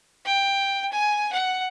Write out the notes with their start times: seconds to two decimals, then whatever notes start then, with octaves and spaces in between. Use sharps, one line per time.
0.25 G5
0.91 G#5
1.32 F#5